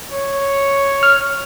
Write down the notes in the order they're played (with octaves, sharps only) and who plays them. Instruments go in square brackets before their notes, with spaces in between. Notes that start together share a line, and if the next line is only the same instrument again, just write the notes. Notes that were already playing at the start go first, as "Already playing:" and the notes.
[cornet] C#5
[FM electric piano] F6